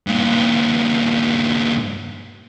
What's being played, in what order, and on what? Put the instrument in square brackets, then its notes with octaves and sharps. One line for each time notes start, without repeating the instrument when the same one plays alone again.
[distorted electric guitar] G2 A#2